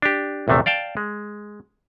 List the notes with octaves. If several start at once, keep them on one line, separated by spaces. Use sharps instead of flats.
D4 G4
A#1 E2 C3 A3
D5 F5 G5 A5
G#3